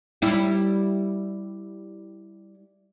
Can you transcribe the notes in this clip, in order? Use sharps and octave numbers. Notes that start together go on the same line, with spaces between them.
G3 E4